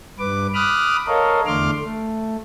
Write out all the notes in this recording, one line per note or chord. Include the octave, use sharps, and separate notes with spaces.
G2 B4 D6
B5 D6 D#6 F6 F#6
A4 A#4 C#5 D#5 F5
E2 D3 A3 C6 D6 F6
A3